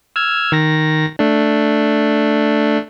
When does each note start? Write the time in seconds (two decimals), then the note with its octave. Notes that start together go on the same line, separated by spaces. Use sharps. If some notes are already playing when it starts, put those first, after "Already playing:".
0.16 E6 F6 G#6
0.52 D#3 A#6
1.19 A3 D4